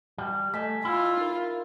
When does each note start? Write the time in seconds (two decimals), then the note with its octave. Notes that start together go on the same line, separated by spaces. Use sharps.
0.18 G3
0.54 A3 D#5 G#5 B6
0.85 E4 F4
1.17 D#4 A#4